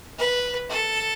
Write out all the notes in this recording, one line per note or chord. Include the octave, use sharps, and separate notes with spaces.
B4
A4